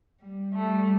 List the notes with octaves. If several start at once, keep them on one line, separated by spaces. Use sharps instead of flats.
G3
G3 A3